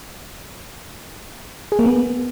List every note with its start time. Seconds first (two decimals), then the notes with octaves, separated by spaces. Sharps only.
1.72 G#4
1.79 A#3
1.86 B3